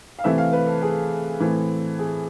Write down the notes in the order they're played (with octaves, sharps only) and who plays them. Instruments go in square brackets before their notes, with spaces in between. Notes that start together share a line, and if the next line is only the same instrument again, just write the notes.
[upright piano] F5
C3 E3 A3 C4 E5
F5
B4
A4
G#4
A2 E3 A3 C4
G#4